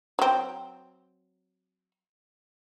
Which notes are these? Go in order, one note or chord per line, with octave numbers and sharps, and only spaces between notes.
F#3 C4